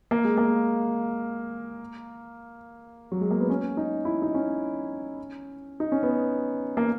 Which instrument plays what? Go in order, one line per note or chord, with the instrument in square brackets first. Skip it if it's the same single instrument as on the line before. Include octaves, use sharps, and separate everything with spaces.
[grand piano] A#3
G#3
A#3
F#3
G#3
A#3
B3
C#4
D#4
E4
D#4
C#4
D#4
C#4
B3
A#3